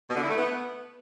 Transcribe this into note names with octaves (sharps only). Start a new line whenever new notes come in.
B2
D3
E4
A3
B3